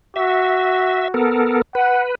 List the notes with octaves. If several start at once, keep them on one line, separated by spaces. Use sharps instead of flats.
F#4 E5
B3 A4 A#4
B4 F#5